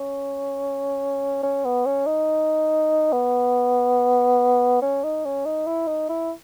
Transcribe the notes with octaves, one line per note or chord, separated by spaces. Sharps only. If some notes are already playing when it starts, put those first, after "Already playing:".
Already playing: C#4
C#4
B3
C#4
D#4
B3
C#4
D#4
C#4
D#4
E4
D#4
E4